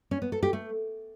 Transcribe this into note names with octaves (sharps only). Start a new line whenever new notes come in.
C#4
B3
A4
G4
A3